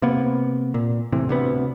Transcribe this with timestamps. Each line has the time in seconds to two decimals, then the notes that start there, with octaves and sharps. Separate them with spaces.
0.02 C3 A#3 B3
0.74 A#2
1.12 A2 C3 E3
1.29 D2 C3 B3